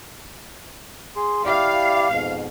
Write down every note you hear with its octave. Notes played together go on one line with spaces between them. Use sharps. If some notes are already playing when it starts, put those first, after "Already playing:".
G#4 C6
E4 G4 D5 F5
F2 G#2 B2